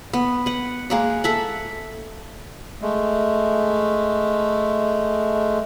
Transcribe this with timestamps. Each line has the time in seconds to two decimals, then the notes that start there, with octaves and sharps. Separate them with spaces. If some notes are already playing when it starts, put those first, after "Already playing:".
0.13 B3
0.46 B4 F#5
0.90 G#3 A#3 F#5
1.24 A4 E5 F#5
2.82 G#3 A3